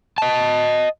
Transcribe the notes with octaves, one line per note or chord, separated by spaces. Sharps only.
D#5 A5